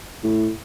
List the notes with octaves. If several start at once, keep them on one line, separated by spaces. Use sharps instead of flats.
A2